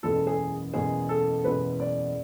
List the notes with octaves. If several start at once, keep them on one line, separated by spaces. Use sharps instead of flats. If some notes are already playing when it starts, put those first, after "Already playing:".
F#1 E2 B2 G#3 A4
G#4
F#1 E2 B2 G#3 G#4
A4
F#1 E2 B2 G#3 B4
D5